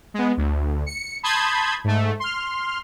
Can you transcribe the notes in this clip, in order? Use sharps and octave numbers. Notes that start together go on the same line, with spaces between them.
G#3 B3
D2
C#7
A5 B5 C6 D#6 G6 G#6
G#2 A3
C6 F6